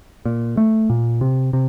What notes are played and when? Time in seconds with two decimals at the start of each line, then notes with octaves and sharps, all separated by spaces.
0.25 A#2
0.57 A3
0.90 A#2
1.21 C3
1.53 C3